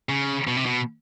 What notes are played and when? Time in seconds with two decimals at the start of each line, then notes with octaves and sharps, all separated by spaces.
0.09 C#3
0.47 B2
0.57 C3
0.66 B2